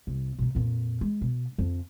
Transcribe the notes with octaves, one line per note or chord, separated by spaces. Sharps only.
C2
B2 D#4
F2 A#2
G#3
B2
F2 D3